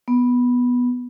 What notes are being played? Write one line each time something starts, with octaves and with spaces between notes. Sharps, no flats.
B3